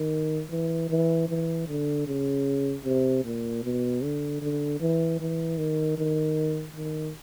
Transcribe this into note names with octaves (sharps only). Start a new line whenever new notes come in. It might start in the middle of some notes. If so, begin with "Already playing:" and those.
Already playing: D#3
E3
E3
E3
D3
C#3
C3
A#2
B2
D3
D3
E3
E3
D#3
D#3
D#3